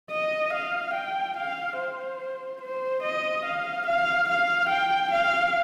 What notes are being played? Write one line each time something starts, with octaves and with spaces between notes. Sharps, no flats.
D#5
F5
G5
F5
C5
C5
D#5
F5
F5
F5
G5
F5